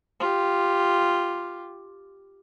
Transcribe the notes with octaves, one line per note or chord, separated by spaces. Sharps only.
F4 G4